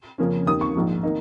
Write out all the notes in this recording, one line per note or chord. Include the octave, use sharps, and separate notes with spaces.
F2 C#3 F3 A#3 C#4
D#2 D#3 A#3 D#6
C#6
A#1 G#2 F3
D#3 A#3 D#4